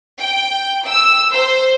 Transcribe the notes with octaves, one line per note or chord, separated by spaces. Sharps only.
G5
E6
C5